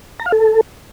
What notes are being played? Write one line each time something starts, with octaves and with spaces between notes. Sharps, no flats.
A#5
F5
A4